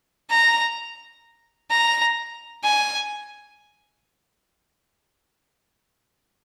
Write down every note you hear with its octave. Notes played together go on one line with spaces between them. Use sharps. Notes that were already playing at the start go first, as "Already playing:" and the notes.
A#5
A#5
G#5